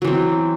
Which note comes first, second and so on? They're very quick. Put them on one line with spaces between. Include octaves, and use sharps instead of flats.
F#3 E3 C4